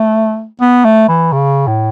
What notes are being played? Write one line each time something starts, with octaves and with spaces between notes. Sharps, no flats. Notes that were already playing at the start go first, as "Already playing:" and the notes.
Already playing: A3
B3
A3
E3
C#3
A2